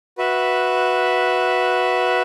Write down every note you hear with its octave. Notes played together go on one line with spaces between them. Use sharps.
F#4 B4 E5